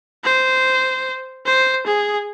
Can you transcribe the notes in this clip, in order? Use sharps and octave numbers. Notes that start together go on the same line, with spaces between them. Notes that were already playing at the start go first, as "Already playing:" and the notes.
C5
C5
G#4